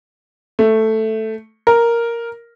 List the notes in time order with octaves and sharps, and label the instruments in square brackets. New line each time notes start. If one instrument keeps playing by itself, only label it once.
[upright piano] A3
A#4